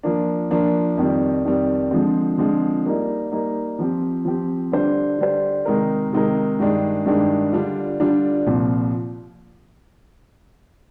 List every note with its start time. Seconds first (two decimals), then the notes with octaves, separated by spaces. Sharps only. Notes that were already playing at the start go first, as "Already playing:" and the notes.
0.03 F3 A#3 D4
0.51 F3 A#3 D4
0.97 F2 D#3 G3
1.45 F2 D#3 G3
1.91 D3 F3 G#3 C4
2.38 D3 F3 G#3 C4
2.86 G3 A#3 D#4
3.32 G3 A#3 D#4
3.79 F3 C4 G4
4.25 F3 C4 G4
4.72 D3 G3 D4 G4 C5
5.18 D3 G3 D4 G4 C5
5.65 C3 D#3 G#3 D#4 A#4
6.13 C3 D#3 G#3 D#4 A#4
6.59 G2 D#3 G#3 D4
7.06 G2 D#3 G#3 D4
7.53 D3 G3 D4 F4
8.00 D3 G3 D4 F4
8.47 C2 A#2 F3 C4